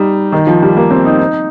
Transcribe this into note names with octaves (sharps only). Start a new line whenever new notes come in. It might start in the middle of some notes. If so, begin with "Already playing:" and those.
Already playing: G3 D#4
D#3
F3
G3
A#3
C4
D#4
D#4